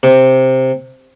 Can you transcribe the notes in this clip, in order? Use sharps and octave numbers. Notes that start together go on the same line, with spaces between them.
C3